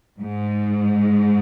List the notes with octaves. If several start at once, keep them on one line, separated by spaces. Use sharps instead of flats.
G#2